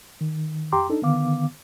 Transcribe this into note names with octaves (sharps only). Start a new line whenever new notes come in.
D#3
F2 G4 G5 A#5 C6 D6
D4 D#4 A4
D3 D#3 B3 F5 D6